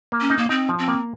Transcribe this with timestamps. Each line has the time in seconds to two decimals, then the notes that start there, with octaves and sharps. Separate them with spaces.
0.12 A#3
0.21 C#4
0.30 D#4
0.38 A#3
0.49 C4 D#4
0.69 F3
0.79 C4
0.88 A#3